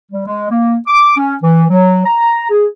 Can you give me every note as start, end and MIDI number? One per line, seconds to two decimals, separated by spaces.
0.12 0.24 55
0.26 0.50 56
0.50 0.75 58
0.87 1.15 86
1.17 1.35 61
1.43 1.64 52
1.70 2.03 54
2.06 2.49 82
2.50 2.66 68